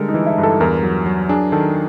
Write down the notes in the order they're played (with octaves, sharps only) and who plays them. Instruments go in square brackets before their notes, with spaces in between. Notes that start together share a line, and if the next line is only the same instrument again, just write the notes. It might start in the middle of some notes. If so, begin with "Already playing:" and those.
Already playing: [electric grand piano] D3 G3 G#3 [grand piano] A4 A#4
[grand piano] D#4
[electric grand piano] E3
[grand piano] E4
[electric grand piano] G2
[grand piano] A4
[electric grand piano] E2 [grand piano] A#4
[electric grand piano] F#3
F#3
[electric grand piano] D4 [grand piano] G#4
[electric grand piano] D#3 [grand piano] A4